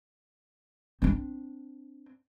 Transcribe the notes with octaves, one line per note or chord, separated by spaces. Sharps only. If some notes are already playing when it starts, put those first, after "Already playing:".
C4 D4